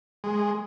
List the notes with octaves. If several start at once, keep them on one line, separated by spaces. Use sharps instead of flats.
G#3